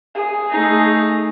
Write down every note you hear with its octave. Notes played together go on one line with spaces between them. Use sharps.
G#4
A3 D#4